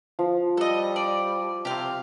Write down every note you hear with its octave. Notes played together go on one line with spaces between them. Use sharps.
F3
G3 A4 D#5
D5
C3 G4 F5